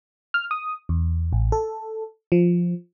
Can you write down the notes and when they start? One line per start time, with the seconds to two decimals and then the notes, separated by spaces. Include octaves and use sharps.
0.34 F6
0.51 D#6
0.89 E2
1.33 A1
1.52 A4
2.32 F3